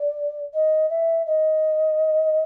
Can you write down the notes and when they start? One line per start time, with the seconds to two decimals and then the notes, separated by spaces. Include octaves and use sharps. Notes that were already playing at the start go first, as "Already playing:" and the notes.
Already playing: D5
0.53 D#5
0.89 E5
1.26 D#5